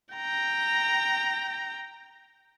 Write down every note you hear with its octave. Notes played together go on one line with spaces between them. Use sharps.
G5 A#5